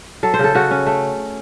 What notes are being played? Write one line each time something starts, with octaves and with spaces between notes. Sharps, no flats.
F#3 A4
C5
C#3 A4
C#3 F#4
C#4
A3